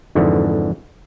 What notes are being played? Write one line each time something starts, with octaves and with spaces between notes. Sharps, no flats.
F2 G#2 D3 E3